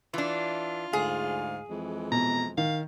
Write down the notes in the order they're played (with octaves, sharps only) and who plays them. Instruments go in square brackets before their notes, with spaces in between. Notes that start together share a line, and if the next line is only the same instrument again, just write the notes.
[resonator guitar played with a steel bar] E3 D4 [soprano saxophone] F4
[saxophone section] D2 G#2 F5 [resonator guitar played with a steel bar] G#4
[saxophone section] F2 E3 G#3
[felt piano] B2 [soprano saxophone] A#5
[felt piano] D#3 [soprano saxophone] F5